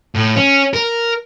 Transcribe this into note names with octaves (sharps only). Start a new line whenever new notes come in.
A2
C#4
A#4